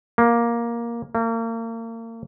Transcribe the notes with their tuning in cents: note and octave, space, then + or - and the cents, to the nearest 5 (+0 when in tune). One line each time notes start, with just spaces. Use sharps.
A#3 +10
A#3 -35